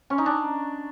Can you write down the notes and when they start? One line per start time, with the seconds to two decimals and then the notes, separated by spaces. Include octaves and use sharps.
0.10 C#4
0.18 D#4
0.26 D4